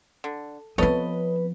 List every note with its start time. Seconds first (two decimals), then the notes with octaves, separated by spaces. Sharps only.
0.24 D3
0.78 F3 B3 C4 A4 B4 C#5 D#5